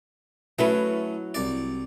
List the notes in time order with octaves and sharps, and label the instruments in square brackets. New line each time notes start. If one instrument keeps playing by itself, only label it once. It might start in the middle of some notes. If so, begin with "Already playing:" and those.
[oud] F#3 E4 B4 [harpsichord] A3 C#4
[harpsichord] C2 D5